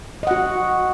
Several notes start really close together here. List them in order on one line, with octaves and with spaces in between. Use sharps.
D#5 F#5 F#4